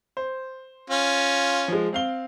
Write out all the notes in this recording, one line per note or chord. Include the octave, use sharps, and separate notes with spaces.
C5
C#4 F4
F3 G#3
C4 F5 G7